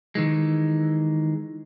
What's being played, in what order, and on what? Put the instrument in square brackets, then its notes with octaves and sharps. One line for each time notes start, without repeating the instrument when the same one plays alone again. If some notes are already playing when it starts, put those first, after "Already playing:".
[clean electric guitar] D#3 E3 G#3